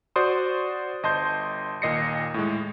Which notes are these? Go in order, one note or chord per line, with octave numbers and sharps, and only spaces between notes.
F#4 C5 D5 C6 D#6
G1 D#5 A5 C6 G6
D#2 A#2 D#5 A#6 C7 C#7
A2 G#3